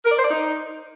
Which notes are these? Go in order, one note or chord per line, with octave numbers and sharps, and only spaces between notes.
A#4
D5
C5
D5
D#4